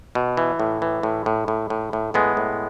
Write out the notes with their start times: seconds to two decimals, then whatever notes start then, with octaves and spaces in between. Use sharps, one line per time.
0.15 B2
0.37 E3
0.60 A2
0.82 E3
1.03 A2
1.26 A2
1.48 A2
1.70 A2
1.93 A2
2.14 A2 G#3 B3
2.37 A2